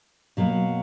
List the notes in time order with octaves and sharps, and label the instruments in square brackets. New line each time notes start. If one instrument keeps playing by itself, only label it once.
[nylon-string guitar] B2 F#3 A#3